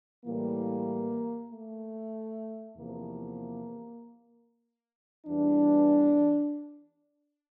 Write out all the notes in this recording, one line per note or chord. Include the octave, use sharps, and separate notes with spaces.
A2 E3 G3 A#3
A3
E2 C3 F3 A#3
E2 E3 G3 D4